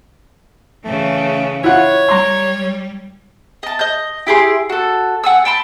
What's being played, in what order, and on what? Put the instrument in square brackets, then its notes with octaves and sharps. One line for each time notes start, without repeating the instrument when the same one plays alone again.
[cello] C#3 E3 [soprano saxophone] A3
[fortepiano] E4 F4 F#5 [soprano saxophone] C#5
[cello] G3 [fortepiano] A#5 C6
[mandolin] D#5 A5
D#5 G6
E4 G4 G#4 C6
F#4 A4
F#5 G#5 E6
G5 A5 B5 C6